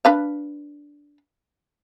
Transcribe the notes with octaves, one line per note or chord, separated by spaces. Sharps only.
D4 B4 F5